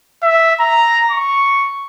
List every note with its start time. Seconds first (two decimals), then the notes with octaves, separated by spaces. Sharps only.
0.23 E5
0.60 A#5
1.11 C#6